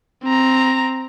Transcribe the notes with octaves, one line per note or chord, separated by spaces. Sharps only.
C4 A#5